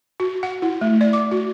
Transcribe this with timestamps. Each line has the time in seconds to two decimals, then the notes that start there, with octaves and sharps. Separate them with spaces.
0.20 F#4
0.43 F#5
0.62 E4
0.81 A3
1.01 D5
1.13 D6
1.31 F#4